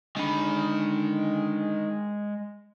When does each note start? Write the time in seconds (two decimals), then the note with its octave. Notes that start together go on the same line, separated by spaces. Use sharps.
0.17 D3 D#3 G#3 B5